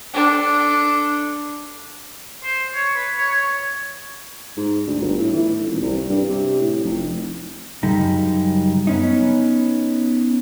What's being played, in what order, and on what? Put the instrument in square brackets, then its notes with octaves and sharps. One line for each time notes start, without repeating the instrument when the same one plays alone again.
[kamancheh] D4 A4
[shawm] C5
C#5
B4
C#5
C#5
[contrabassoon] G#2
D2
G1
A2
E3
A2
D#1
C2
G2
C3
A2
F1
[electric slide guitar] F#2 C#3 G3 D#4
B3 C#4 D#4